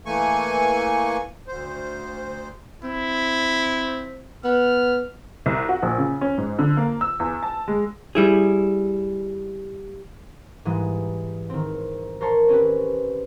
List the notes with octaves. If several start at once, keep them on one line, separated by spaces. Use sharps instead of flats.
E3 A3 A#3 G#5 C#6
D2 C5
C4 E4
B3 F6
C2
F#4
A#1
C#3
C#4
G#2
D3
A#3
E6
E2
A5
G#3
G3 E4 G#4
G#2 E3 G3 G#3
D#3 C4
A#4 C5 C#5 A5 C6
C4 C#4 G4 B4